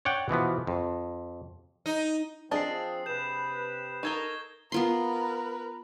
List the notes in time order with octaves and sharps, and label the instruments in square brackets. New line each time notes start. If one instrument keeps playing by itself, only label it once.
[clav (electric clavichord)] C#5 D5 F#5 G5
B2 E3 F3 B3
F2
[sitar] D#4
[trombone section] F3 C4 [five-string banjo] D4 D#5 [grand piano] G#4 A5 [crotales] D#6 C7
[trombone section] C3 G4 B4 [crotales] G6 E7
[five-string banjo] D#4 A4 A#4 [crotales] C#6 G#6 G7
[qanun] B3 F4 C6 [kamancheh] A#4 B4